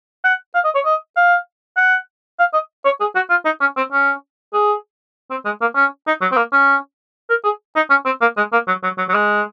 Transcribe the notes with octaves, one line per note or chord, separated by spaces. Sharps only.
F#5
F5
D#5
C#5
D#5
F5
F#5
F5
D#5
C#5
G#4
F#4
F4
D#4
C#4
C4
C#4
G#4
C4
G#3
A#3
C#4
D#4
F#3
C4
A#3
C#4
A#4
G#4
D#4
C#4
C4
A#3
G#3
A#3
F#3
F#3
F#3
F#3
G#3